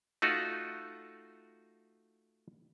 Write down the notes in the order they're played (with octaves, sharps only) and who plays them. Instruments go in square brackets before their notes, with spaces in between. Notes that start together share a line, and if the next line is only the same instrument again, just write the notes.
[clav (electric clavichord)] A3 D#4 F4 F#4